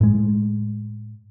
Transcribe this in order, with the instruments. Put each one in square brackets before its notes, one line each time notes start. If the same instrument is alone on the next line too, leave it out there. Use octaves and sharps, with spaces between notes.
[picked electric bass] A2 G#3